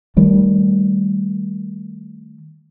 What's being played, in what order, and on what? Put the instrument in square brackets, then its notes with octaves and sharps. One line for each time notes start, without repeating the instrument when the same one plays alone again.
[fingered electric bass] D#3 G3 A3